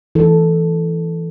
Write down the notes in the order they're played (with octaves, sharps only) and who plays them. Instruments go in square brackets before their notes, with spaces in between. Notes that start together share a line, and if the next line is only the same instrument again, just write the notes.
[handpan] E3 A4